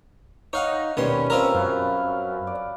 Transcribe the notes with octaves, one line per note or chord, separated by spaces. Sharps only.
D#4 C#5 F5 F#5
D#2 B2 G3 C#4 C6
C4 F4 A#4 E5 A#5
F#2 C#4 B4 F5
D5